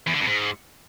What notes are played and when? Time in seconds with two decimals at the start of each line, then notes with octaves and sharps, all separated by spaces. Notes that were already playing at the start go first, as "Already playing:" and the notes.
0.07 E2
0.14 D3
0.21 F2
0.27 G#2